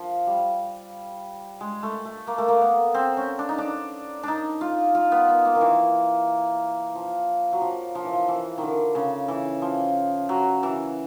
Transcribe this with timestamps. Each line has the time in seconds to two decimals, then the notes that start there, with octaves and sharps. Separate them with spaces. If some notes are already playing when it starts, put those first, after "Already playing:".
Already playing: F3
0.27 G3
1.61 G#3
1.83 A3
2.05 A3
2.27 A#3
2.38 A3
2.48 A#3
2.61 B3
2.94 C4
3.17 C#4
3.39 D4
3.49 D#4
3.58 D4
4.23 D4 D#4
4.61 F4
4.95 F4
5.12 B3
5.28 B3
5.45 A#3
5.55 D#3
5.61 E3
6.95 F3
7.53 F#3
7.61 F3
7.95 F3
8.05 E3
8.13 F3
8.28 E3
8.58 D3 D#3
8.95 C#3
9.28 E3
9.62 F3
10.29 F#3
10.63 E3